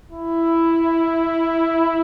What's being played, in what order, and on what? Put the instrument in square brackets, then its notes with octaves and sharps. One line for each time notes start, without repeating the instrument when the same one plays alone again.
[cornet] E4